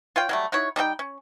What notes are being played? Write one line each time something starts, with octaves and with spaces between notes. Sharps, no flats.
F4 C#5 F5 G5
F#3 G3 A3
D#4 E4 F#4 C#5
G3 D#4 A4 G5
C#4